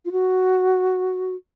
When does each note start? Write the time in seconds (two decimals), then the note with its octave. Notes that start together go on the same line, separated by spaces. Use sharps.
0.05 F4
0.12 F#4